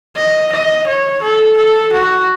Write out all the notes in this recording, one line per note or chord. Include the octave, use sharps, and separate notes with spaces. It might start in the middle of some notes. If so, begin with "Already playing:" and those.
D#5
D#5
C#5
A4
A4
F#4